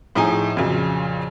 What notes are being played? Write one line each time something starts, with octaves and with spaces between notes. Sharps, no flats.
A2 F3 D#4 G#4 G#5
F2 A#2 C#3 F#3